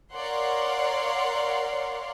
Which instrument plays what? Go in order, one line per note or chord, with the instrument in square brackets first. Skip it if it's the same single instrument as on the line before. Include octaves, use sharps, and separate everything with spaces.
[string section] A#4 C#5 D5 F5 F#5 C6